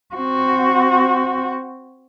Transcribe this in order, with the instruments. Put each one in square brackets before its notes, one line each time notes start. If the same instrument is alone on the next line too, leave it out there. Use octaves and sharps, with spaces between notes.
[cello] C4 F#4